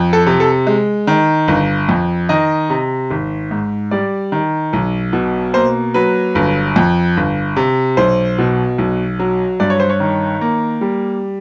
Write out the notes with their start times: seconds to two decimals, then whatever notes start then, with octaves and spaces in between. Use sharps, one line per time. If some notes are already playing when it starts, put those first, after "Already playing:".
Already playing: F2
0.13 A4
0.26 C3
0.40 A4
0.67 G#3
1.07 D#3
1.48 G1
1.89 F2
2.29 D#3 D#5
2.70 C3
3.11 G#1
3.51 G#2
3.91 G3 D5
4.32 D#3
4.73 B1
5.13 B2
5.54 A#3 C5
5.94 F#3 B4
6.35 G1
6.76 F2
7.17 G1
7.56 C3
7.97 B1 C5
8.38 B2
8.78 B1
9.19 F#3
9.60 G2 D5
9.70 C#5
9.80 C5
9.90 C#5
10.00 D#3
10.41 A#3
10.81 G3